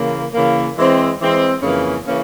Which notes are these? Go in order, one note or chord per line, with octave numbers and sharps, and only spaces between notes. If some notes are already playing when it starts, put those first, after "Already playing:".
Already playing: C#3 E3 A#3
C#3 E3 A#3
E3 G#3 C4
E3 G#3 C4
F2 C#3 E3 A#3 C#4
C#3 E3 A#3 C#4